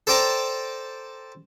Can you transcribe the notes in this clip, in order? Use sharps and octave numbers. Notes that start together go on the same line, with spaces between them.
A4 C5 D5 G5 A5 A#5